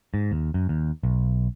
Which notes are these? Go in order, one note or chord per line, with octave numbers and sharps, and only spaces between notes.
G#2
D#2
F#2
D#2
B1